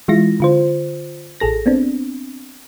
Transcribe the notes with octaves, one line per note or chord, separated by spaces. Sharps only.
E3 G#3 E4 F4 A#6
D3 F4 C5
A1 G#4 A4 A#6
B3 C4 D4